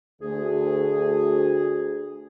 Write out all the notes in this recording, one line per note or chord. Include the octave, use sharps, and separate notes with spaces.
D2 G#4